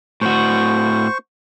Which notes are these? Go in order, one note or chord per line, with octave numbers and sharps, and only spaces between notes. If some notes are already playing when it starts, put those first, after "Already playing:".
A2 F#4 C5 C#6